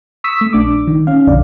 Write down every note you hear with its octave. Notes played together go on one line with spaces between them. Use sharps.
C#6 D#6 E6 B6
A3
A#1 D4 D6
D#3
C#4 F5
B1 F2 D3 D5